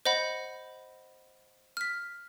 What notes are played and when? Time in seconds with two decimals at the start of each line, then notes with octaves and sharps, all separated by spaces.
0.05 C5 D#5 F#5 B5
1.77 F6 B6